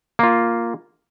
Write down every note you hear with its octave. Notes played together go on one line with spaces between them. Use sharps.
A#3 F4